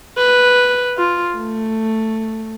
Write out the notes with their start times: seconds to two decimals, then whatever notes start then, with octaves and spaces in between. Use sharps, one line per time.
0.17 B4
0.98 F4
1.36 A3